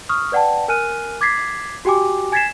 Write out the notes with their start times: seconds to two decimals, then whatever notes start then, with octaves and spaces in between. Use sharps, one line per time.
0.09 C#6 D#6 F6
0.32 B4 D5 F#5 G5 A5
0.68 A#4 G#5 F6 F#6 D#7
1.21 D6 G#6 A6 B6 C7
1.85 F#4 G4 G5 G#5 D6
2.32 G#5 G#6 A6 B6 C7 E7